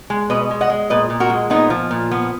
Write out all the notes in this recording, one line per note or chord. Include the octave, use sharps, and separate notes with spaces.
G#3
B2 B4 D#5
G#3
D#5 F#5
G#3
A#2 B4 D#5
A#2
F#4 A#4
G#3
A#2 B3 D#4
F3
A#2
F3 B3